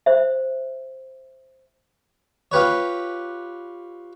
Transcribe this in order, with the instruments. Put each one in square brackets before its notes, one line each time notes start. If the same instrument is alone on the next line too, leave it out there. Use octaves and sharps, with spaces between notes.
[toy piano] C5 E5
[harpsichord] F4 G4 B4 C#5